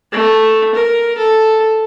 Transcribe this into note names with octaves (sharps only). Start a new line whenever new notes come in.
A3
A#4
A4